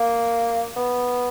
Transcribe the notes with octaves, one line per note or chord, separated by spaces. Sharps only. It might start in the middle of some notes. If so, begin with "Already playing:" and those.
Already playing: A#3
B3